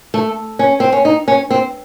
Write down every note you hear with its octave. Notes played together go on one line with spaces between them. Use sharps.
A3
C#4
C4
C#4
D#4
C#4
C4